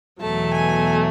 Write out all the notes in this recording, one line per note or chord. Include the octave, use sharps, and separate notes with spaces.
E2 B2 F#3 A3 A5
G#5